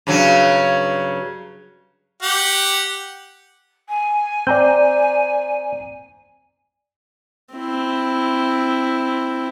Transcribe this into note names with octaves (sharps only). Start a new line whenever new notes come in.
G2 C#3 F#3
G4 F#5
G#5
C4 C5 D5 A#5 G6
C4 E4